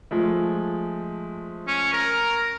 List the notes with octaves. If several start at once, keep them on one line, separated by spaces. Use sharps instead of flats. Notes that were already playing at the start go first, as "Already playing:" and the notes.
F3 G#3 A3
C#4
A#4